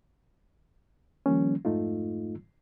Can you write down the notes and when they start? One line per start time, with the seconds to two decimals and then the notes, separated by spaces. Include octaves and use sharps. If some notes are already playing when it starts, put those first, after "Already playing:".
1.26 D#3 F3 G3 A#3 C#4
1.65 F2 G#2 A3 D#4 F4